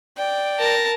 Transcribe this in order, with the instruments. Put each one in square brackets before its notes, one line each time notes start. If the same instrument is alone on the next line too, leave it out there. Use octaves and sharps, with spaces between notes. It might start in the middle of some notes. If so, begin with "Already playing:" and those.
[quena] D5 [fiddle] G5
[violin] A#4 A#6 [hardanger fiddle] A5